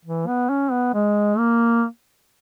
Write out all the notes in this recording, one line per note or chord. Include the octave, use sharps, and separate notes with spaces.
E3
B3
C#4
B3
G#3
A#3